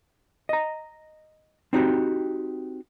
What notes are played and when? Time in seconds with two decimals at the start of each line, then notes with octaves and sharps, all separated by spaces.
0.49 D#5 A#5
1.73 C4 D#4 F#4 G4